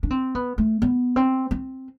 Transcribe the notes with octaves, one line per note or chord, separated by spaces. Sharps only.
D4
C4
B3
A3
B3
C4
C4